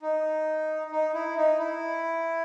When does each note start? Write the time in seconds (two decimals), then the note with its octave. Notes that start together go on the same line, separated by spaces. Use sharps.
0.02 D#4
0.91 D#4
1.14 E4
1.37 D#4
1.59 E4